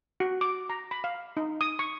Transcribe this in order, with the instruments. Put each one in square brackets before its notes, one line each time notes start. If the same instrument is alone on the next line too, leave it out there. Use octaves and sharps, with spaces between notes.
[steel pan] F#4
D6
A#5
B5
F5
D#4
D#6
C#6